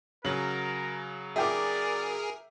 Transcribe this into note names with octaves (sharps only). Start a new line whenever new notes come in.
C#3 F#3 A#4 F#7
G#4 A#4 D5 E5 G5 D6